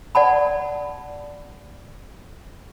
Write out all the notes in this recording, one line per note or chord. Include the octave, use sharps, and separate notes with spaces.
D5 F#5 A5 B5